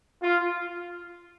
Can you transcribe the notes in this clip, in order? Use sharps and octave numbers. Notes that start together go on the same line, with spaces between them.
F4